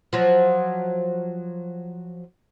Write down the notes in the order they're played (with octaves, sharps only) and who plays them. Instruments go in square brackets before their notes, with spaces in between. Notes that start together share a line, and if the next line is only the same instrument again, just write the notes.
[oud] F3 F#3